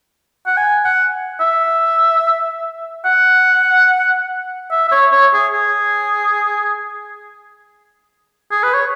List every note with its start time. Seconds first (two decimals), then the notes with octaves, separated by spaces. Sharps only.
0.46 F#5
0.57 G#5
0.85 F#5
1.40 E5
3.05 F#5
4.71 E5
4.88 E5
4.92 C#5
5.12 C#5
5.33 G#4
5.54 G#4
8.51 G#4
8.63 B4
8.74 C#5